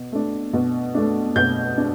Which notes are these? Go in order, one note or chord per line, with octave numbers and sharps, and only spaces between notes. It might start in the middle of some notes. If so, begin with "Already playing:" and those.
Already playing: B2
A3 D4
B2
A3 D4
B2 G6
D4